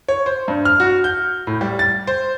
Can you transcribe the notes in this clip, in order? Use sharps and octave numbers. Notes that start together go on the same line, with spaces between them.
C#5
C5
G2
F6
F#4
G6
A2
G3
A6
C5